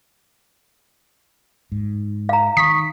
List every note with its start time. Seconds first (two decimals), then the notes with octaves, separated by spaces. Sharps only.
1.72 G#2
2.29 F5 A#5
2.57 D#3 C#6 D#6 B6